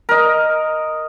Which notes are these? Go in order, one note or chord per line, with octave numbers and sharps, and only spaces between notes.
A#4 D#5